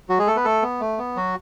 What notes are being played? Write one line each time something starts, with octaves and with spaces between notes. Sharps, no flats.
F#3 F#4
G#3 G#4
A3 A4
B3 B4
A3 A4
B3
A3
B3
F#3 F#4